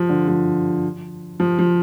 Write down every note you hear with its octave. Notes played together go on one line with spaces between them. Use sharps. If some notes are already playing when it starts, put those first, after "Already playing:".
Already playing: F3
D3
F3
F3
F3